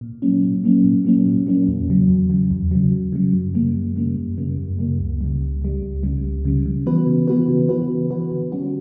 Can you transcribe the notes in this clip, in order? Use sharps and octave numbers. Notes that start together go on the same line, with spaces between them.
A#2
F#3 A#3 C#4
A#2
F#3 A#3 C#4
A#2
F#3 A#3 C#4
A#2
F#3 A#3 C#4
E2
C#3 F#3
E2
C#3 F#3
E2
C#3 F#3
E2
C#3 F#3
F#2
C#3 G3 A#3
F#2
C#3 G3 A#3
F#2
C#3 G3 A#3
F#2
C#3 G3 A#3
C#2
C#3 G3
C#2
C#3 G3
C#2
C#3 G3
C#2
C#3 G3
C#3
E3 B3 F#4 B4
C#3
E3 B3 F#4 B4
C#3
E3 B3 F#4 B4
C#3
E3 B3 F#4 B4
D3
G3 C#4 F#4